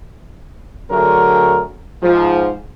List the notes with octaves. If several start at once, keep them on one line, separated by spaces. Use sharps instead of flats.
D3 F#3 A3 F#4 G#4 A#4
G#2 F3